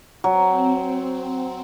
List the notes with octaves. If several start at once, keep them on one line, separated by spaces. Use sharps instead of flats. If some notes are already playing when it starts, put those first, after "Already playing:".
F#3 C4